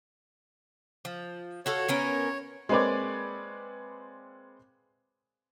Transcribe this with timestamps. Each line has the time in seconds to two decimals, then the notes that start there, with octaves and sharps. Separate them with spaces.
1.05 F3
1.66 F#4 A4 C#5 F5
1.88 B3 C#4 A#4
2.69 G#3 A#3 C4 B4 C#5 D5